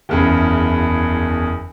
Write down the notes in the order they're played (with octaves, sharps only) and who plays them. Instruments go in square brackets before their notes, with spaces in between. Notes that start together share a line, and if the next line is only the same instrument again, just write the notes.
[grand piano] F#1 E2 C#3